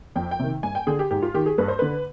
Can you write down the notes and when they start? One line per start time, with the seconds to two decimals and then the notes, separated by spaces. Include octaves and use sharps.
0.16 F2 G5
0.31 G5
0.39 C3 D#3
0.63 G2 G#5
0.75 G5
0.87 D3 G#4
0.99 G4
1.11 G#2 G4
1.22 F4
1.34 D#3 G4
1.46 G#4
1.58 G2 B4
1.68 C5
1.79 D3 B4